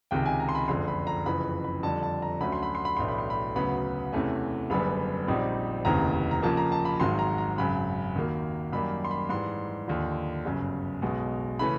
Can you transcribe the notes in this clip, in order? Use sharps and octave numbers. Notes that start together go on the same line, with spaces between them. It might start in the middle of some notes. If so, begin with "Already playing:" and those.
C#2 C3 D#3 G5
G#5
A#5
C6
B5
F#1 F2 D3 C6
B5
A#5
F#1 F2 C#3 E3 B5
B5
F2 D3 G3 A5
A5
A#5
D2 D3 F#3 A3 C#4 B5
C6
B5
C6
B5
B1 A2 E3 A3 D4 C6
B5
C6
B5
D2 C#3 F#3 B3 B5
E2 C3 E3 A3 C#4
F#1 F#2 D3 G3 B3 B5
A#1 A#2 G3 C4 D#4
F1 D#2 C#3 E3 A#5
A#5
F2 C#3 F3 A#3 A5
A#5
A5
B5
G#1 G#2 D#3 F#3 C6
A#5
A#5
G#1 F#2 C#3 B5
D#2 D#3 F#3 A#3
F#2 D#3 G3 A#3 B5
C6
B5
G#2 E3 G3 C6
D#2 D3 F3
G1 F#2 C#3
B1 B2 G#3
C#3 E3 A3 C#4 B5